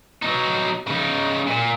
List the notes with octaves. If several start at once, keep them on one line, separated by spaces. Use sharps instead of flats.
F#3 D#4
C#3 D#4
A#2